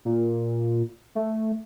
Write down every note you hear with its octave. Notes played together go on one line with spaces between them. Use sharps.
A#2
A3